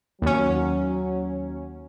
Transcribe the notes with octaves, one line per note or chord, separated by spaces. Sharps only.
D#2 F#3 C#4